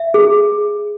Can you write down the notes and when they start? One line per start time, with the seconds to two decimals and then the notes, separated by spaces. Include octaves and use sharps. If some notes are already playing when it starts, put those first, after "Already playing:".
Already playing: E5
0.14 G#4